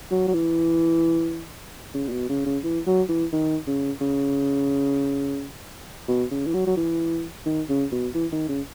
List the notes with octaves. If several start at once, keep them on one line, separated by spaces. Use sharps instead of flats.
F#3
F#3
E3
C#3
A#2
B2
C#3
C#3
E3
F#3
E3
D#3
C#3
C#3
B2
C#3
E3
F#3
F#3
E3
D#3
C#3
B2
E3
D#3
C#3